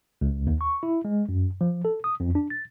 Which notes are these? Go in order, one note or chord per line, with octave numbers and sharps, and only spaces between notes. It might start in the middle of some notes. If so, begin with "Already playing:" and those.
C#2
D#2
C#6
E4
G#3
F#2
F3
A4
D#6
F2
D4
A6